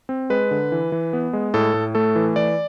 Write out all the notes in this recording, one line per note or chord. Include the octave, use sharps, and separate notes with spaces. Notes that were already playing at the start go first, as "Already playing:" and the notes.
C4
G#3 B4
D3
E3
E3
B3
G#3
A2 A4
A2
A3 A4
E3
E3 D5